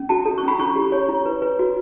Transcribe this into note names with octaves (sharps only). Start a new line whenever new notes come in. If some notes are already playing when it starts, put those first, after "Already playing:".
Already playing: C#4
F#4 A5
A4
C#6
C#4 B5
E4 C#6
G4
C#5
E4
B4
B4
F#4